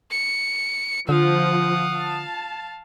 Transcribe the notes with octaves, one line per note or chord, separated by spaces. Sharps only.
C#7
D3 F3 F5 F#5 D#6
A5